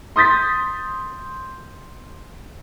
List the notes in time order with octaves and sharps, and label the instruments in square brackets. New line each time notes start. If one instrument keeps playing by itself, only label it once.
[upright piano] C6 D#6 G6 A6 B6